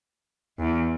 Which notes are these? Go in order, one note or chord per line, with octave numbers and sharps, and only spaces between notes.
E2